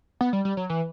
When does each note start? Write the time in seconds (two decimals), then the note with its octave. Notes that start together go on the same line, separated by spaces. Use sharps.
0.21 B3
0.33 G3
0.45 G3
0.57 F#3
0.70 E3